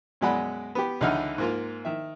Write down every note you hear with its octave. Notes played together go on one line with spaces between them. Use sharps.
F#2 B2 G#3 D5 F#5 B5
B3 G4
C#2 D3 E3 D#4 F#5 F6
G#2 A#3 F4
D#3 E5